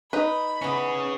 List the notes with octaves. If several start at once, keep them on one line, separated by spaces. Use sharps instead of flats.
D#4 B4 B5
E3 B3 C#4 G#4